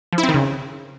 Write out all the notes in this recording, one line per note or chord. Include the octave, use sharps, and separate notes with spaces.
F3
E4
C4
D#3
C#3